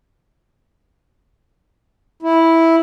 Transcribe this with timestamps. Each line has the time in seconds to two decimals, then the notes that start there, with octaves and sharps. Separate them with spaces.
2.22 E4